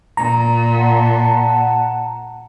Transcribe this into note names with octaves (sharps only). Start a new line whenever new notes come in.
A#2 A#5
F#5 A5